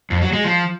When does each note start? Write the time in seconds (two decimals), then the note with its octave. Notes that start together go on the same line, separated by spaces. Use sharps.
0.10 F2
0.22 F#3
0.33 G#3
0.44 F3